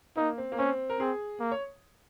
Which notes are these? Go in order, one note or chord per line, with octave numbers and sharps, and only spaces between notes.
A#3 D#4
C4
A#3
C4 C#4
A#4
C4 G#4
A#3
C#5